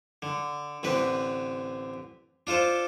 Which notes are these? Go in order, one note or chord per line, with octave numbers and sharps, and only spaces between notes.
D3
A1 D3 C4 B4
D4 F4 A4 C5